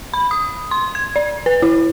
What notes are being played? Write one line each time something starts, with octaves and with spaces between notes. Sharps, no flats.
B5
D#6
C6
G#6
D5
B4
E4